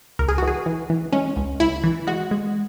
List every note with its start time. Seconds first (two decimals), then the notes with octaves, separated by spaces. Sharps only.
0.19 C#2 A#4
0.28 G#4
0.38 E3 F#4
0.48 G#4
0.66 E3
0.90 E3
1.13 G#3 C#4
1.36 C#2
1.60 C#2 E4
1.84 E3
2.07 G#3 F#4
2.31 G#3